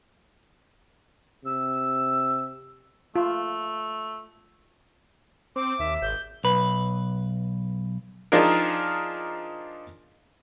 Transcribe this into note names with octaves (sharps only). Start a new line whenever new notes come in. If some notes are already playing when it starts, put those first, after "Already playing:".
C3 E6
A3 F4
C4 D6
D#2 E5
G#1 G6
B1 B4
F3 D4 D#4 F4 G#4 A#4